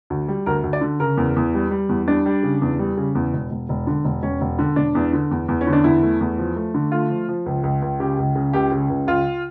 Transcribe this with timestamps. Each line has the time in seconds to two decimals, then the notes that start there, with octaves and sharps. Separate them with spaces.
0.10 D2
0.28 G3
0.46 D2 A#4
0.64 D2
0.73 D5
0.81 D3
1.00 C#3 A#4
1.17 E2
1.36 E2
1.54 G3
1.71 G3
1.89 E2
2.08 G3 D4
2.26 G3
2.43 C#3
2.62 E2
2.79 G3
2.97 C#3
3.15 E2
3.33 E1
3.51 E1
3.69 E1
3.87 D3
4.05 E1
4.23 E1 C#4
4.41 E1
4.59 D3
4.76 E1 D4
4.95 E2
5.13 D3
5.31 E2
5.48 E2
5.61 C#4
5.67 D3
5.73 D4
5.84 E2 E4
6.03 A3
6.21 E2
6.38 F3
6.56 A3
6.74 D3
6.92 A3 F4
7.10 F3
7.29 F3
7.46 C#2
7.63 C#2
7.82 C#2
8.00 C#3 G4
8.18 C#2
8.36 C#3
8.53 C#2 G4
8.72 C#3
8.90 C#2
9.07 C#2 F4